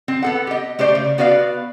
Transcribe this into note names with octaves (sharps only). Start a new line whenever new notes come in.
C4
B3 A4 F#5
G4 D#5
A3 G4 C5 D5
C#3
B3 F#4 B4 D5 F5